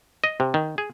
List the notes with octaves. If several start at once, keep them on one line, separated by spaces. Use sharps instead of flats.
D#5
C3
D#3
G#4